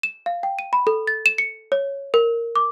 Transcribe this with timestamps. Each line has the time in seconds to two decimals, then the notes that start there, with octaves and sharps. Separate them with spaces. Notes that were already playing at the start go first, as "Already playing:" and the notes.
0.03 E7
0.26 F5
0.43 G5
0.59 D#7
0.73 B5
0.87 A4
1.07 A6
1.26 E7
1.38 C#7
1.72 C#5
2.14 A#4
2.56 D6